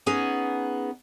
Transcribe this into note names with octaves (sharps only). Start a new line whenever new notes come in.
B3 C#4 D#4 G#4